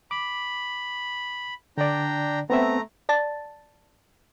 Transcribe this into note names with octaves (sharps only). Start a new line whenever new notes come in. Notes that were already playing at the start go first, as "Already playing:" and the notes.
B5 D6
D3 D4 D5 G5 A#5
A3 B3 C4 E5 A#5
D5 A5 A6